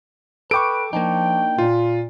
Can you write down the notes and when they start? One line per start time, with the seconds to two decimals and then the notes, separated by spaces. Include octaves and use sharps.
0.51 A4 B4 G5 C#6 D6 D7
0.93 F3 A#3 D4 D#4 G5
1.58 A#2 F4